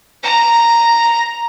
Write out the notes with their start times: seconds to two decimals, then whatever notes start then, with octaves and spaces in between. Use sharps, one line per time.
0.23 A#5